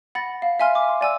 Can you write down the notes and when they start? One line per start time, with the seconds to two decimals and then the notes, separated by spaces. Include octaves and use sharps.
0.15 F#5 B5 A6 A#6
0.42 F5
0.60 E5 F5 G#5 C6 F6
0.75 D6
0.89 C6
1.01 D5 G#5 E6